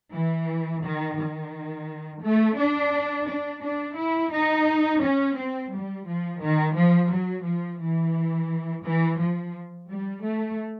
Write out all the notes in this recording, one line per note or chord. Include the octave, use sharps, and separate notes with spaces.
E3
D#3
D#3
A3
D4
D4
D4
E4
D#4
C#4
C4
G3
F3
D#3
F3
F#3
F3
E3
E3
F3
G3
A3